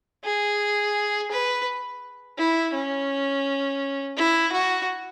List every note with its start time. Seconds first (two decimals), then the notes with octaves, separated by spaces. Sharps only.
0.24 G#4
1.32 B4
2.38 E4
2.74 C#4
4.18 E4
4.52 F#4